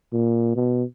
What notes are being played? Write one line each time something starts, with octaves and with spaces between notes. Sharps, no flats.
A#2
B2